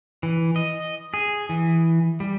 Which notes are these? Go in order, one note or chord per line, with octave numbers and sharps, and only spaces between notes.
E3
D#5
G#4
E3
G3